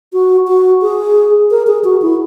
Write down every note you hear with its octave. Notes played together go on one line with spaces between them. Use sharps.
F#4
F#4
G#4
A#4
G#4
F#4
E4